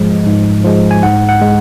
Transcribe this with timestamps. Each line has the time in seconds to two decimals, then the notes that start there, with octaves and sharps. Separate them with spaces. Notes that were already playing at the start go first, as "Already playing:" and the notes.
Already playing: G#2 F3 G#3 D#5
0.26 G#2
0.64 F3 G#3
0.91 G#5
1.03 G#2 F#5
1.29 F#5
1.41 G#3